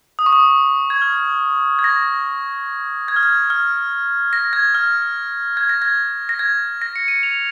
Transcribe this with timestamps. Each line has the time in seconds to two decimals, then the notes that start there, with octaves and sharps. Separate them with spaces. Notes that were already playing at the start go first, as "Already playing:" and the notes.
0.19 D#6
0.26 C#6
0.32 D#6
0.90 G#6
1.02 F6
1.79 G#6
1.84 A#6
3.08 G#6
3.16 F6
3.23 G#6
3.50 F6
4.33 A#6
4.53 G#6
4.75 F6
5.57 G#6
5.69 A#6
5.82 G#6
6.29 A#6
6.39 G#6
6.82 A#6
6.96 C#7
7.08 D#7
7.23 F7